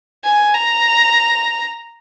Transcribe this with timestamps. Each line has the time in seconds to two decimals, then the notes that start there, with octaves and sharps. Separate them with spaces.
0.24 G#5
0.54 A#5